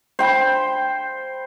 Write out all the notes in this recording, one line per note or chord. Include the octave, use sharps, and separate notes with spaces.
C5 G5 B5